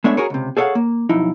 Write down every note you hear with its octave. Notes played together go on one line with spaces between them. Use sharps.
G#3 A3 B3 D4 C#5 E5
F#4 G#4 A#4 C#5
C#2 C3
G#4 A4 C#5 D#5 F5 F#5
A#3
B1 F2 D#4 E4